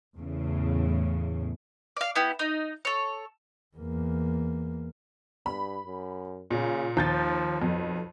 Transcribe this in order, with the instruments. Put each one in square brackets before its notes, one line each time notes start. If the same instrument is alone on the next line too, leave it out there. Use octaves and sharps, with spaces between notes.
[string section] E2 A2 C#3
[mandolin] D5 F5
B3 E4 G4
D#4
A4 C#5
[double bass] E2 A#3
[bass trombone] G2 [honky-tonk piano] B5
[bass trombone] F#2
[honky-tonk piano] A#2 [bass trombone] C#3
[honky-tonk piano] D#2 G6 A6 [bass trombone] F3
[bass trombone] B1 [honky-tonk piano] F2